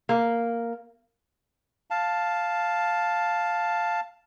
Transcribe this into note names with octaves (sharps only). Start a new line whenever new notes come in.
A#3
F5 A5